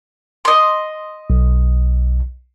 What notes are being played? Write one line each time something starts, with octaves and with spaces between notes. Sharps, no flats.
D#5 C6
B1